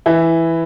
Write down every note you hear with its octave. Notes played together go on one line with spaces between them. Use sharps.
E3 E4